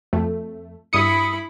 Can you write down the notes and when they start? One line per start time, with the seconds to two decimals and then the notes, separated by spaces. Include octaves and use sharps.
0.13 F2 A3
0.93 G2 E4 B5 D#6 C#7